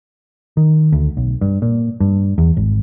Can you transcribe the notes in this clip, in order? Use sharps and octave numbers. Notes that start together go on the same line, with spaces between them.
D#3
D2
B1
G2
A#2
G2
E2
G#1